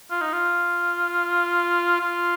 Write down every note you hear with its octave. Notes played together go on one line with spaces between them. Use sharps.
F4
D#4
F4
F4